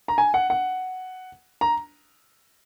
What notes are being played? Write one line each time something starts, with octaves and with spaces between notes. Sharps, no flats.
A#5
G#5
F#5
F#5
A#5